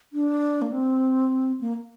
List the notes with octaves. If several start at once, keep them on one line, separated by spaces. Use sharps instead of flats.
D4
A#3
C4
A#3